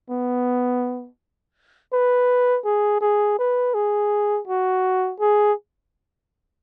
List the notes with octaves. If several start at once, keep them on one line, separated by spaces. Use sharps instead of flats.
B3
B4
G#4
G#4
B4
G#4
F#4
G#4